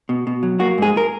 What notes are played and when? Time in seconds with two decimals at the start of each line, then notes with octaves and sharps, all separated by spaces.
0.09 B2
0.27 B2
0.43 F#3
0.60 A#3 F#4
0.78 G#2 G#4
0.97 A#4